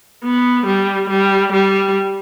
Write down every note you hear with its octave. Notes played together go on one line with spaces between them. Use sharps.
B3
G3
G3
G3